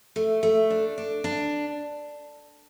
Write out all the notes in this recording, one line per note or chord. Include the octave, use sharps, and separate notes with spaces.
A3
A3
D4
D4
D4